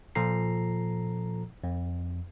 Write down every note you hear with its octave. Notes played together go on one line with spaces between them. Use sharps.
A#2 F3 A4 A#5 C7
F2